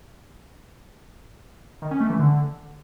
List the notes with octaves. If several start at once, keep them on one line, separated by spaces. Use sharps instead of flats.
D#3
C#4
A3
E3
D3